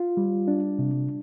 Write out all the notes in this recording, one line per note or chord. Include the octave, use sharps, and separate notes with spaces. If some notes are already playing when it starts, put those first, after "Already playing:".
Already playing: F4
G3
D4
C3